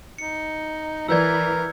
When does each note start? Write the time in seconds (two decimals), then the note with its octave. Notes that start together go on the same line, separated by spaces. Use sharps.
0.18 D#4 C#7
1.08 E3 E4 A#4 B4 D5 E6 G6 G#6